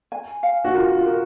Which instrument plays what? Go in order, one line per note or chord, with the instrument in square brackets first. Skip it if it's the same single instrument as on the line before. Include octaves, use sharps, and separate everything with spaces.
[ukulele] G#5
F5
[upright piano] F#4
[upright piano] F4 [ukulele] A#4
[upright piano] F4
[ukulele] A#4